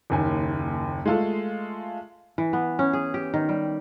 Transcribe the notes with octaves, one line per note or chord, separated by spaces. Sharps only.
F#1 D#2 G#5
G#3 A3 F4 A4
E3
B3
C#4
G#4
G4
D#3
G3